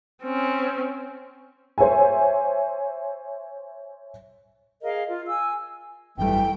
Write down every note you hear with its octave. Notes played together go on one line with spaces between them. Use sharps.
C4 C#4
C5 C#5 E5 G#5
G#4 A#4 D#5 F5
F4
G#5 E6
G#1 F#2 E3 G3 A3 G5